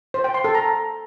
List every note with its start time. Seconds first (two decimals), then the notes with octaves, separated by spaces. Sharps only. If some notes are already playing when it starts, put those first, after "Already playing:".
0.14 C5
0.24 G5
0.34 C6
0.44 A4
0.55 A#5